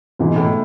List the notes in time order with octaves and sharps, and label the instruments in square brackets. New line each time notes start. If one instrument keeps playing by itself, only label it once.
[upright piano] G#2 E3 G#3 D#4 [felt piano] B2
[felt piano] A2